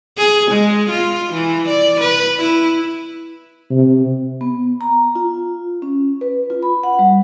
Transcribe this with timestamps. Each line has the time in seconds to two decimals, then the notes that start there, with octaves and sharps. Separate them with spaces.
0.17 G#4
0.51 G#3
0.90 F4
1.33 E3
1.69 D5
2.00 B4
2.39 E4
3.71 C3
4.41 B3
4.81 A#5
5.15 F4
5.82 C#4
6.21 B4
6.50 F4
6.63 B5
6.83 F#5
6.99 G3